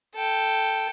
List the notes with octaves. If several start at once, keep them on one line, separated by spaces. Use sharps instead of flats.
A4 G5